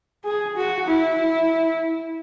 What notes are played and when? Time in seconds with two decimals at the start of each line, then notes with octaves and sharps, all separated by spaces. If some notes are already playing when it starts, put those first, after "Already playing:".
0.24 G#4
0.56 F#4
0.87 E4